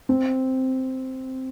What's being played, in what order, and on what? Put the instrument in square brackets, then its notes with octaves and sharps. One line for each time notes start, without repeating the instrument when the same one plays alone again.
[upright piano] C4